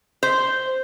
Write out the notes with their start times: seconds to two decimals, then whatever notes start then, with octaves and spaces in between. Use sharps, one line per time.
0.23 C5